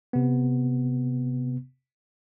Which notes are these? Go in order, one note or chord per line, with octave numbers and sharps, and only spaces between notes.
C3 B3